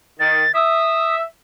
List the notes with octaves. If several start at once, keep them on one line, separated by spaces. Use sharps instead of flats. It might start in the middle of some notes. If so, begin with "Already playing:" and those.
D#3 A6
E5 D#6